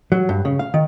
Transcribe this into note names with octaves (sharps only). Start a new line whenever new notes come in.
F#3
G2
C#3
F5
D#3